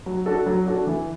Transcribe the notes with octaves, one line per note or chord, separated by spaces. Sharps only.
F#3
D4 F#4 A4
F#3
D4 F#4 A4
E3